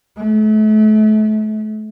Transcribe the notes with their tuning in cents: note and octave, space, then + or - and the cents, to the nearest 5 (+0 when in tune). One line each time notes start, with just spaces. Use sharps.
A3 -35